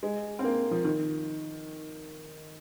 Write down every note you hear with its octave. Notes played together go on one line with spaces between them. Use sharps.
G#3
C4
A#3
F3
D#3